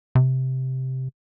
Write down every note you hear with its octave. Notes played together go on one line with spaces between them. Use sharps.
C3